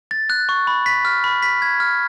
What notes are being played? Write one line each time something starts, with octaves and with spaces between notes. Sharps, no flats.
A6
F#6
C#6
B5
B6
F6
B5
B6
G#6
F6